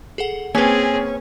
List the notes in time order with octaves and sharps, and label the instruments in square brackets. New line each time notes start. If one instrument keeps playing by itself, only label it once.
[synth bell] G#4 A4 F#5
[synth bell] A#3 B4 [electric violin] C4 G#4 [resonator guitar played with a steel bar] C#4